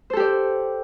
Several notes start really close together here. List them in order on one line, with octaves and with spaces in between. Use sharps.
C5 A4 G4 D5